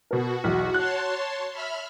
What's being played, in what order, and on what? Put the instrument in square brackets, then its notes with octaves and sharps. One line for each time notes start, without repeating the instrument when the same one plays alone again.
[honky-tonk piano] B2 A#4 [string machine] F#4
[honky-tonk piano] B1 E2
[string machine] C#5 A5 C6 [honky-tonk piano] F#6
[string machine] E5 B5 F6